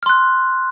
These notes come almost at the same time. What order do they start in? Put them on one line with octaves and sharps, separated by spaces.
F6 C6 F#6